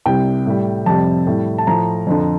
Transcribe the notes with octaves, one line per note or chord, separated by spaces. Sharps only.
C2 C3 G3 G5
A2 G3
F2 C3 G3 A5
A2 G3
A5
A2 F3 A#5
F2 D3 F3